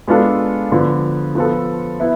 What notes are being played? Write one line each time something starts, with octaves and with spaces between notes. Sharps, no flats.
G#3 B3 D4 F4 A4
D3 F3 B3
F3 B3 F4 A4
B3 E4